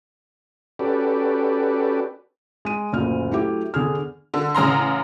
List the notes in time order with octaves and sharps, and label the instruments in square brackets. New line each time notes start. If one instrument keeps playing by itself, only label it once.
[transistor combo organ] C#4 F#4 G4 A4 B4 D5
[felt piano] G#3 D#7
F#1 D2 A#2 F6
F#3 A3 E4 G4
E2 D3 G#4 F6
[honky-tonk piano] D3
A1 C#3 A#5 C6